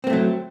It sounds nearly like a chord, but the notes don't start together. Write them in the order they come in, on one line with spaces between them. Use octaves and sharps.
C4 A#3 A3 F#3